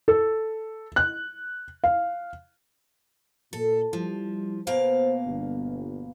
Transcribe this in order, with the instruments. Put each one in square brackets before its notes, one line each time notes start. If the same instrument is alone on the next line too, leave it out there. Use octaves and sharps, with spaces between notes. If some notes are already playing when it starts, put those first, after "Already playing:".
[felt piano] A4
F#6
F5
[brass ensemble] A#2 [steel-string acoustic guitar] A4
[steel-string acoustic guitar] F3 [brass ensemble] G3 E4
[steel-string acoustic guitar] B2 A#3 F5 [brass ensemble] C5
[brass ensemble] G1